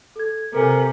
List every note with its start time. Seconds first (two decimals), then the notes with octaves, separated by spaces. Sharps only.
0.16 A4 G#6
0.53 C3 A4 A#4 G#5